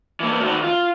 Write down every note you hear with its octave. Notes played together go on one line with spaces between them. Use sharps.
E3 A#3
D#3 F#4
F4